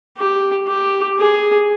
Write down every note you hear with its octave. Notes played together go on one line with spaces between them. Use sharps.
G4
G4
G#4